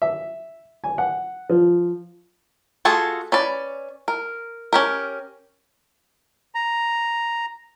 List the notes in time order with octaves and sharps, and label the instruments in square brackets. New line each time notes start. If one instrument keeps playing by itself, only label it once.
[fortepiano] E5
G#5
F#5
F3
[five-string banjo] A3 F4 F#4 G#4 A4
C#4 B4 D5
A#4
C#4 G4 A#4
[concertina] A#5